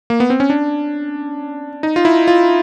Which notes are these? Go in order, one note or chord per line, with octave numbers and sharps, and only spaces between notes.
A#3
B3
C4
C#4
D4
D#4
F4
E4
F4